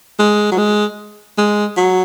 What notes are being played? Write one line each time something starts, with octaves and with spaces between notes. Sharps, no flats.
G#3
F#3
G#3
G#3
F#3